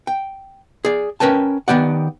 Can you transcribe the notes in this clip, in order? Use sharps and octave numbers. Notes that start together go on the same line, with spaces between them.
G5
G#4 D5
C#4 A#4 B4 G5 A5
D#3 B3 G4 D5 F#5